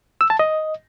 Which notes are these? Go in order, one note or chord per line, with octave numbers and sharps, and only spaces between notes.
E6
A5
D#5